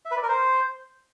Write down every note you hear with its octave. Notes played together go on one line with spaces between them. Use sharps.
E5
B4
D5
A#4
C5